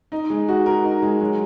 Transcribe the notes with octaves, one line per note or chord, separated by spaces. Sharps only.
D#4
G#3
F#4
A#4
D#4
G#3
F#3